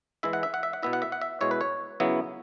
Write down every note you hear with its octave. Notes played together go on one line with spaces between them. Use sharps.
E3 G#3 E4 E5
F#5
E5
F#5
E5
F#5
B2 B3 E4 E5
F#5
E5
F#5
E5
B2 G#3 E4 C#5
B4
C#5
C#3 F#3 B3 E4